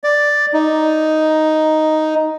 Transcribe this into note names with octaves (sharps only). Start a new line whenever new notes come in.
D5
D#4